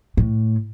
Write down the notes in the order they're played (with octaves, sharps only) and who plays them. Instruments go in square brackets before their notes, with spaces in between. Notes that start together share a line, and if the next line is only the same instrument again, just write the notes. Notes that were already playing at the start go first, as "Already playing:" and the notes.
[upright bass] A2